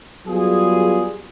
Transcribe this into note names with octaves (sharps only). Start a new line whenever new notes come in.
F#3 G3 B3 F4 G#4